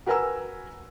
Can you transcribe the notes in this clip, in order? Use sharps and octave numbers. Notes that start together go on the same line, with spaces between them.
F#4 A#4 B4 G#5 A#5 E6